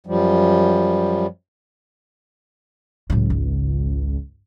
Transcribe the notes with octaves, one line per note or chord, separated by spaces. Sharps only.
F#2 F3 G3
C#2 A2 F#3
G#1